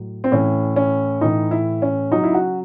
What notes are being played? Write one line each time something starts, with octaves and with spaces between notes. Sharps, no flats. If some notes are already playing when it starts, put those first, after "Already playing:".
Already playing: A2 F#3
C4
A2 E3 C#4
C#4
A2 E3 D#4
E4
C#4
C#3 F#3 D#4
E4
F#4